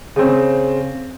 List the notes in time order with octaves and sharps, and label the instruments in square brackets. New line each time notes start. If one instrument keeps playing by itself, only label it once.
[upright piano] C#3 C4